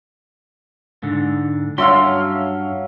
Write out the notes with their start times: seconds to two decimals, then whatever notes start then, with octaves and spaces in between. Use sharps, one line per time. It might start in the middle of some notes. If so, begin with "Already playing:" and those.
1.03 G#2 D3
1.78 G2 F#3 C#4 E5 F5 C6